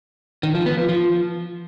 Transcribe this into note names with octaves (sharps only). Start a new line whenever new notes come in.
D#3
F3
B3
F3
F3